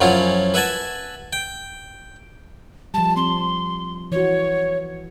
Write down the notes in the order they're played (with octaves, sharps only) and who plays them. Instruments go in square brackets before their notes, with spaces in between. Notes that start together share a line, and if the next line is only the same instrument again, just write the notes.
[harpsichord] F#2 F3 F#3 C#4 E4 F4
B4 E5 F#5 G#5 A5
G5
[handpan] F3 G3 [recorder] A5
[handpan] C4 [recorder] C6
[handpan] E3 F#4 [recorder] C#5